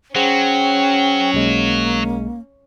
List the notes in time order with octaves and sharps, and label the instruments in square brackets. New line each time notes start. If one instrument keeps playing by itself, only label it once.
[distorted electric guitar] F#3 [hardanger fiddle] C#4 [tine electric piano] G#4 C5 F#5 [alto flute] G5
[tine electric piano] B1 G#3 [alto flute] A#3